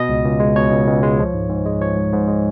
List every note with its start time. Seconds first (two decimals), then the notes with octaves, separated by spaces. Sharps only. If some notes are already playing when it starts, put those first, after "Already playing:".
Already playing: B2 D#5
0.09 C#2
0.25 C#2
0.40 G#3
0.55 B2 C#5
0.72 C#2
0.87 C#2
1.03 G#3
1.19 F3
1.34 G#2
1.49 G#2
1.66 G#3
1.81 F3 C#5
1.96 G#2
2.13 G#2
2.28 G#3